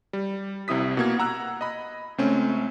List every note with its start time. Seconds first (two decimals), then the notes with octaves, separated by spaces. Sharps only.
0.13 G3
0.68 C2 C3 E4 D#6 B6
0.97 B2 A#3 G#6
1.19 F#5 A#5 E6 F#6
1.61 D#5 B5
2.18 C#2 A3 C4 C#4